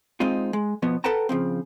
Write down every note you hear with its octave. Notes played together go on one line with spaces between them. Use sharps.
G#3 C4 D#4 F4
G#3
B2 F3 B3
A4 B4 F#5 G5 A5 A#5
C#3 F3 C4